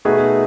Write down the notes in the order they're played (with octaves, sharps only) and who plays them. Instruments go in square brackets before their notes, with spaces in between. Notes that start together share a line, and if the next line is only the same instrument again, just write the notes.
[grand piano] B2 A3 D#4 F#4 B4 [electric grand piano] G#4